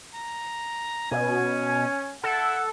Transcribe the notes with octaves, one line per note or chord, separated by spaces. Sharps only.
A#5
B2 C#4 G#5
E4 A4 F#5